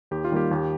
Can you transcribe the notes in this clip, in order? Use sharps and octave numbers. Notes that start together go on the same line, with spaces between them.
D#2 G4
F4
D#3 G3 A#3 G4
D#2